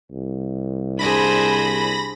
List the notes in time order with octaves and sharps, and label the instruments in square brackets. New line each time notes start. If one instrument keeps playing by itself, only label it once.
[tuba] C2
[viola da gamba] D4 G#4 C5 [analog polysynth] B5 A#6